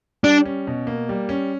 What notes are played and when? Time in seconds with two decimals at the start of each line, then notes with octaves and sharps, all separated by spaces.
0.24 G3 D4
0.46 C#4
0.67 B2
0.87 A#3
1.09 G3
1.29 C#4